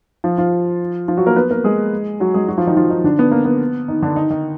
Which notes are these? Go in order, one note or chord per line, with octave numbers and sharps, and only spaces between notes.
F3 F4
F3 F4
F3 F4
F#3 F#4
A#3 A#4
B3 B4
A#3 A#4
G#3 G#4
F#3 F#4
G#3 G#4
F#3 F#4
F3 F4
D#3 D#4
F3 F4
D#3 D#4
D3 D4
B3
A#3
B3
D#3 D#4
D3 D4
D#3 D#4
D#3 D#4